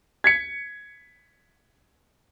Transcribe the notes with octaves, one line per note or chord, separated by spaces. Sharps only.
G#6 B6 C#7